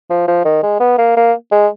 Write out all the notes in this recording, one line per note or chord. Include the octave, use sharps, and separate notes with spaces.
F3
F3
D#3
G#3
B3
A#3
A#3
G#3